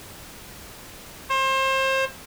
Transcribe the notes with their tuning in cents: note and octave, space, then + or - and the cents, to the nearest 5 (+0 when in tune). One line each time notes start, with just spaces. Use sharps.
C5 +30